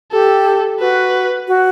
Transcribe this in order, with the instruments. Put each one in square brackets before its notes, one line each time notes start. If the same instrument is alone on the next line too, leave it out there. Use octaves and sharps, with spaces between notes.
[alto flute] G4 [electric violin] A4
[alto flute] F#4 [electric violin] B4
[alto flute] F#4